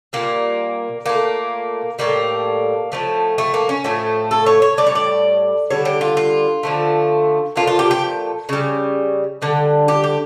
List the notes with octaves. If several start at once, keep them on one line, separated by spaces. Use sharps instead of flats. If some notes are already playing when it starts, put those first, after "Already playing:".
A#2 G3 A#3
A#2 A3 A#3
A2 G3 A#3
A2 F3 A3
A3
A#3
C#4
A2 F3 A3
A4
C#5
C#5
A2 G3 D5
C#5
D5
D3 G3 C#5
G4
F4
F4
D3 F3 A3
A#2 F3 A3 F4
F4
G4
G4
C#3 G3
D3 G3
G4
G4